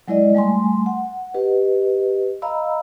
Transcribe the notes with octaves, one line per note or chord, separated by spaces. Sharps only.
F#3 G#3 E4 D5 D#5
G3 A3 G#5 C6
F#5
G4 B4 D#5
D#5 F5 A#5 B5 E6